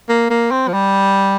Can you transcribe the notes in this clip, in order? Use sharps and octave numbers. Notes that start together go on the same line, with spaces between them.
A#3
A#3
C4
F3
G3